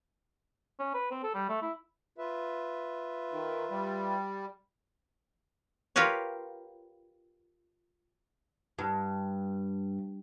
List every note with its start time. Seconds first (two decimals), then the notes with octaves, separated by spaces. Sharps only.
0.79 C#4
0.94 B4
1.11 C4
1.23 A4
1.34 G3
1.49 A3
1.62 E4
2.18 F4 B4 E5
3.32 D#3
3.71 G3
5.96 F4 G4 A#4 B4 C#5
8.79 G2